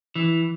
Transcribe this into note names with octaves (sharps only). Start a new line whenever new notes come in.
E3